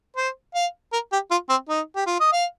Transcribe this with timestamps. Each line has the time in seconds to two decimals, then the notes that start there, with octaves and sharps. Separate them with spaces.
0.17 C5
0.55 F5
0.93 A#4
1.12 G4
1.31 F4
1.49 C4
1.69 D#4
1.96 G4
2.07 F4
2.20 D#5
2.33 F5